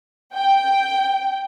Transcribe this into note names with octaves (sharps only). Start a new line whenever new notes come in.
G5